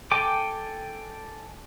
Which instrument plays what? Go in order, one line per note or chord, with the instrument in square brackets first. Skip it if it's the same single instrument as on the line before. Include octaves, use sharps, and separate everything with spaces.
[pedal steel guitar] A4 G5 G#5 D6